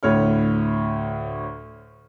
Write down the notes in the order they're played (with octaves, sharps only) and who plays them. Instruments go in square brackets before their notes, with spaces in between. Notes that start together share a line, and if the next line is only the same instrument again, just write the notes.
[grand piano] D2 A2 C#5 F6